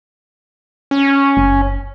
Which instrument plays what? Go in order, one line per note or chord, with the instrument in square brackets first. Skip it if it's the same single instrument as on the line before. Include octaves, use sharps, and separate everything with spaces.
[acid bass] C#4
[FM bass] F#1